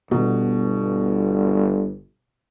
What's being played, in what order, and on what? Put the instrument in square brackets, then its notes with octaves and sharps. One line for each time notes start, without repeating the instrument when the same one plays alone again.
[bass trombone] G1 [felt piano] B2